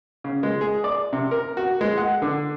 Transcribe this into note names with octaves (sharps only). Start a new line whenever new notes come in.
C#3
G#3
G#4
D5
C3
A#4
F#4
G#3
F#5
D3